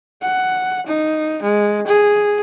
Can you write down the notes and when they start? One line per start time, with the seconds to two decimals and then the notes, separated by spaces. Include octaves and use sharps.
0.22 F#5
0.87 D#4
1.43 G#3
1.87 G#4